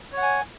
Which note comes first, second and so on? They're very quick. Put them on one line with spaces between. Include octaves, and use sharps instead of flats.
C#5 F#5 G#5